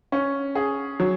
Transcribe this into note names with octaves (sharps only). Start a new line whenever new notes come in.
C#4
G#4
F#3